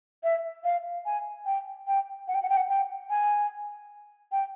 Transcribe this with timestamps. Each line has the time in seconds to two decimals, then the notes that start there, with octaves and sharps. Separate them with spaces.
0.24 E5
0.64 F5
1.06 G#5
1.46 G5
1.87 G5
2.28 F#5
2.35 G5
2.42 F#5
2.49 G5
2.57 F#5
2.69 G5
3.10 G#5
4.32 G5